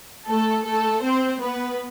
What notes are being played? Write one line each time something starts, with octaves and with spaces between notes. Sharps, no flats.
A3 A4
A3 A4
C4 C5
B3 B4